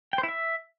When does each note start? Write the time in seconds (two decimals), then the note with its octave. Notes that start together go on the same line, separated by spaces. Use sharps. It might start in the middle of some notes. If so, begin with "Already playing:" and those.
0.13 G5
0.18 C5
0.23 E4
0.28 E5